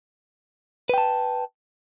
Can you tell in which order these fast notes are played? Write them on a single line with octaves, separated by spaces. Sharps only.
B4 G5 A5